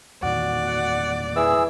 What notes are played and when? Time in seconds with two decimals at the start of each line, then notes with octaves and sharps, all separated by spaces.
0.23 E2 A#2 D#3 F#4 D5
0.66 F#5
1.36 E3 G#4 E6